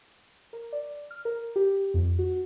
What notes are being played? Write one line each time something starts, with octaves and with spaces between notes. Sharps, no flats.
A#4
D5
F6
A#4
G4
F2
F#4